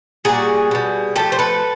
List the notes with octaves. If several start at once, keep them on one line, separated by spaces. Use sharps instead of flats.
A#2 G3 F#4 G#4
B2 G3
D3 F3 A3 G4 A4
C5
A4 B4